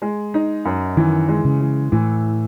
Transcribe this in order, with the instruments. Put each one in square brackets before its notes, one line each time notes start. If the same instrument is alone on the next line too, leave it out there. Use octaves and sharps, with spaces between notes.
[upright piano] G#3
D#4
F#2
[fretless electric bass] D#3 [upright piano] E3
[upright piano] G#3
[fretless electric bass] C#3
[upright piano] E3
[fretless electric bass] A2 [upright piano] E3